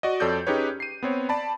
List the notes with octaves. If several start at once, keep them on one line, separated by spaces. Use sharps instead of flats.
F#4 D5 D#5
F2 A4 C#5 D5 G6
C#4 D#4 G4 G#4 B4 C#5
C7 D#7
B3 C4 C#5
D5 A5 B5